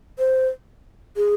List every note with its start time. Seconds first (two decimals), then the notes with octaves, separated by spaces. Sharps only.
0.19 C5
1.16 G#4